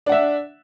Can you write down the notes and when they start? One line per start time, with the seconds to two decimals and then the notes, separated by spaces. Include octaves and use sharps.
0.06 D4
0.09 F#5
0.12 E5